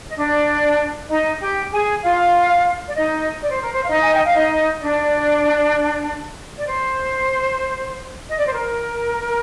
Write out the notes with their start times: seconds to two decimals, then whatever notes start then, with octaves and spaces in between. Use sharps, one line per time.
0.08 D#5
0.17 D4 D5
1.09 D#4 D#5
1.40 G4 G5
1.71 G#4 G#5
2.03 F4 F5
2.87 D5
2.95 D#4 D#5
3.42 D5
3.52 C5
3.63 A#4
3.73 C5
3.83 F5
3.89 D#4 D#5
4.03 G#5
4.14 G5
4.25 F5
4.34 D#4 D#5
4.81 D4 D5
6.57 D5
6.67 C5
8.29 D#5
8.38 D5
8.46 C5
8.53 A#4